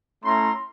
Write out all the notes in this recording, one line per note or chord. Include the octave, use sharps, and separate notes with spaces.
A3 C#4 E4 A#5 C6